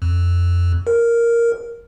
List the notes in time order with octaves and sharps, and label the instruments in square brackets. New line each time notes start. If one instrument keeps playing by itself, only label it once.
[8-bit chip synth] F2
A#4